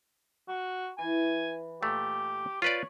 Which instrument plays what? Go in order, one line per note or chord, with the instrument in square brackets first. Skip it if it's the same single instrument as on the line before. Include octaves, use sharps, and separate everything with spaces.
[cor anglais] F#4
[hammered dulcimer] E3 [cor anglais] G#5
[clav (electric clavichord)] A#2 A3 [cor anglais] G4
[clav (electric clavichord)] F4 B4 D5 [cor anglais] C#5